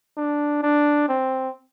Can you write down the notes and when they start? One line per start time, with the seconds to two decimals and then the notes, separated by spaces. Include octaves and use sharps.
0.17 D4
0.63 D4
1.09 C4